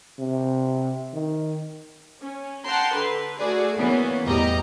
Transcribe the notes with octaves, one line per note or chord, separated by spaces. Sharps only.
C3
D#3
C#4
F#5 G5 A5 A#5 C6
D3 B4
A3 F#4 G#4 D5
E3 A#3 B3 C#4
E2 A2 G3 G4 D#5 A#5